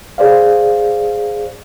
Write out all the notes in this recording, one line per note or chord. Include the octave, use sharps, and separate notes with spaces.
G#4 C5 D5 F5